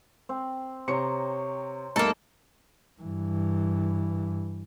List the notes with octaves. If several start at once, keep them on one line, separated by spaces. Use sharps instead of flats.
C4
C3 C5 C#5 A#5 C#7
G1 A3 A#3 D#4 A4 A6
G2 E3